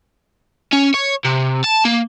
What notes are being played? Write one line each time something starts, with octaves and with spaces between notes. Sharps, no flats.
C#4
C#5
C3
A5
A#3